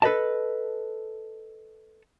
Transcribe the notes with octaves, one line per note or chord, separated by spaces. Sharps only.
A4 B4 D5 D#5 A5